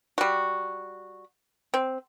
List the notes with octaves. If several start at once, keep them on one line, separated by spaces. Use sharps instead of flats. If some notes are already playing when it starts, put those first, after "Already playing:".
G3 F#4
C4